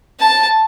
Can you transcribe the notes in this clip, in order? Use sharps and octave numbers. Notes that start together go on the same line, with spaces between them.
A5